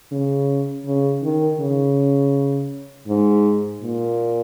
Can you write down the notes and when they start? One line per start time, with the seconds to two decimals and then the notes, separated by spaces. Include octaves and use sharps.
0.12 C#3
0.86 C#3
1.23 D#3
1.60 C#3
3.08 G#2
3.82 A#2